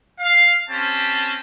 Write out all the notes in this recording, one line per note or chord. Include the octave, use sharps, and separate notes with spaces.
F5
C4 C#4 G4 A5